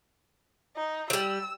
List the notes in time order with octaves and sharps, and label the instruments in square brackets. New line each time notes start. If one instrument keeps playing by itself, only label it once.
[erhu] D#4
[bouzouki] F3 G3 [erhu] E6